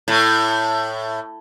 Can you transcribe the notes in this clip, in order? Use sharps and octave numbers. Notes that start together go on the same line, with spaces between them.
A2